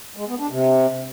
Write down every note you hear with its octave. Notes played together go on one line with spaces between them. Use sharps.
G#3
B3
D4
C3